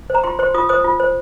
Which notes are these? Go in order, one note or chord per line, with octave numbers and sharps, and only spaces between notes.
C5 A#5
F4 C6
C5 C6
F4 D#6
C5 D#6
F4
C5